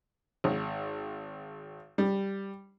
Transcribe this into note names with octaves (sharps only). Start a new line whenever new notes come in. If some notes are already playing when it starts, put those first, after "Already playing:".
G#1
G3